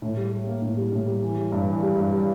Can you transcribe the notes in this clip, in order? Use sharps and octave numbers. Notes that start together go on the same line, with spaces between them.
A2
G3
G3
A#3
A2
G3
A2
G3
E3
G3
G2
E3
G3
G2
G3